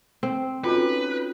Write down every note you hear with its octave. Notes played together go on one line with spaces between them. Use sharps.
C4
C#4 D#4 F4 F#4 A4 B4 G5